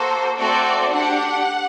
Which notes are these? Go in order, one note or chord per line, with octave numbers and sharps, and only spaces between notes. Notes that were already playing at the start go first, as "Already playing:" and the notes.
Already playing: A#3 F#4 A4 C5
A3 C4 F#4 A4 D5
D4 G4 F#5